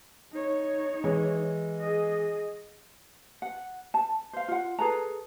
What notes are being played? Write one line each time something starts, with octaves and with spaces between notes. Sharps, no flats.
D#4 C#5
E3 G#3
G#4 D#5
F#5
A5
C5 F5
F4 F#5
G#4 A4 B4 A#5